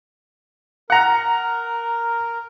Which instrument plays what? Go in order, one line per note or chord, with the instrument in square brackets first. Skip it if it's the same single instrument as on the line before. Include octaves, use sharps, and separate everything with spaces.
[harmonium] A#4 [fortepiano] F#5 A#5